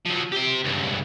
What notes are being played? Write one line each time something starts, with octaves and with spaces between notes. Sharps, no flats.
F3 F#3
G4 C5
C#2 G2